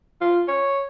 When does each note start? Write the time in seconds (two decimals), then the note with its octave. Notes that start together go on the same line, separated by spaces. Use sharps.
0.21 F4
0.48 C#5